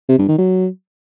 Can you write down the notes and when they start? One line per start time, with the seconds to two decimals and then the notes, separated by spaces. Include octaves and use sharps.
0.09 C3
0.19 G2
0.28 D#3
0.38 F#3